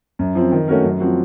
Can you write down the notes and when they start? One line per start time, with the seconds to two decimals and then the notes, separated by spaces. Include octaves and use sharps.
0.19 F#2
0.35 F3 C4
0.52 D#3
0.68 A3 C#4 F#4 A#4
0.84 F#2
1.00 F3 C4 F#4